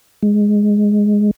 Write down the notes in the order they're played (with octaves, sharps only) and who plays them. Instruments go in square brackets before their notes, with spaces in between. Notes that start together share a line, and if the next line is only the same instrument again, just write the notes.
[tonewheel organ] G#3